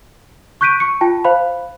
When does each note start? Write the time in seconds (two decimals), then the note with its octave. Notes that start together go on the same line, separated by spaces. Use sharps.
0.61 C#6 F#6 G6 B6 D7 D#7
0.80 C#6 C#7
1.01 F4 G5 A5
1.25 C5 F5 B5